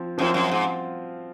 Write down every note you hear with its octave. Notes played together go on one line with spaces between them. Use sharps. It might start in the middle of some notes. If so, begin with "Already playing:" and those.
Already playing: F3 C4 F4
F#2 F3 C4 F4
F#2
G#2